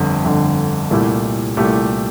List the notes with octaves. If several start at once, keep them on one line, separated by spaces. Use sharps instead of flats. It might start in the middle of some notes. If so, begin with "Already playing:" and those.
Already playing: G1 F2 D3
G1 F2 D3
C2 A#2 A3 E4 G4
C2 A#2 A3 E4 G4